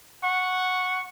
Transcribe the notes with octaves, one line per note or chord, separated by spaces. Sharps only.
F#5 C#6